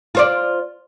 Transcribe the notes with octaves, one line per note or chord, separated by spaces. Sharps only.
F4 C5 D5